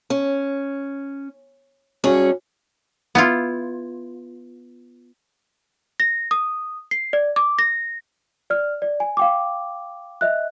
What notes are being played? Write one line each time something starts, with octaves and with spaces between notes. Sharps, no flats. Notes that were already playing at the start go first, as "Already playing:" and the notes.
C#4
G2 C#4 F#4 G#4
B3 E4 F4
A#6
D#6
C7
D5
D6
A#6
D5 F6
D5
G#5
F5 G5 D6
D#5 E5 F#6